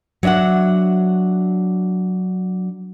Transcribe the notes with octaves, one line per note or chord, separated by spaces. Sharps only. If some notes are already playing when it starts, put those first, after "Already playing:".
F#3 D4 D#5 E5 F#5